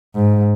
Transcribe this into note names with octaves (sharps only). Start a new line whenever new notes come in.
G#2